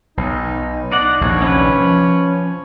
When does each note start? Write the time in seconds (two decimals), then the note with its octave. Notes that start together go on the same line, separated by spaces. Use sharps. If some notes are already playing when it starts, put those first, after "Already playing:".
0.17 B1 D#4
0.92 D4 D#4 D5 F#5
1.21 A#1 D#2 C3 C#5
1.42 C#4 B4
1.80 F3